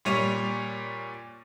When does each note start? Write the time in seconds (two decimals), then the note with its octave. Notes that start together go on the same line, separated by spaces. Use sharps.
0.05 A#2 G3 C#5 D#7